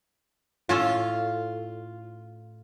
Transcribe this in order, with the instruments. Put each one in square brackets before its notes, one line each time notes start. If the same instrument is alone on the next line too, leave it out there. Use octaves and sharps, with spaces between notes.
[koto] A2 C#4 A4 [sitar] F4